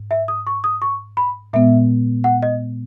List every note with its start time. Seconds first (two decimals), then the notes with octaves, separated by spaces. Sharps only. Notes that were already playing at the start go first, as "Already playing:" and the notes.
Already playing: G#2
0.11 E5
0.28 D#6
0.47 C#6
0.64 D#6
0.82 C#6
1.17 B5
1.53 A#2 G#3 B3 E5
2.24 F#5
2.43 D#5